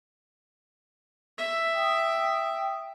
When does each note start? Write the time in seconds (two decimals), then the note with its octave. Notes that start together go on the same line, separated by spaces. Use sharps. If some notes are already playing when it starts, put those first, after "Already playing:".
1.38 E5
1.73 G5 D#6